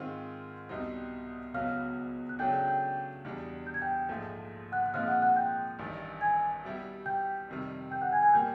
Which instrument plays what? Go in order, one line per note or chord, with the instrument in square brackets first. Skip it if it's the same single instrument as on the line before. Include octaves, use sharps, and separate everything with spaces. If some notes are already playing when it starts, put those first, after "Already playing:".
Already playing: [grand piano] G#2 D#3 G#3 C4 F4
C2 B2 G3 C4 D#4
[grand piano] C#2 B2 F#3 B3 [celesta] F5 F6
[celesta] F#6
[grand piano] C#3 F#3 A3 D4 [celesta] G5 G6
[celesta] G5 G6
G5 G6
[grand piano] E2 B2 G3 B3 D4
[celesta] G6
G#6
G5 G6
[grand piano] A#1 G#2 F3 A3
[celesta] F#5 F#6
F#6
[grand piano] A#2 F3 G#3 C4 D#4 [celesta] F5 F6
[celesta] F#5 F#6
F#5 F#6
G5 G6
[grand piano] A1 G2 D#3
[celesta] G#5 G#6
[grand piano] B2 G3 B3 E4 G4
[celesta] G5 G6
[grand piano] F2 C3 D#3 G3
[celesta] G5 G6
F#5 F#6
G#5 G#6
G#5 G#6
[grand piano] A#2 G3 A#3 [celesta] G5 G6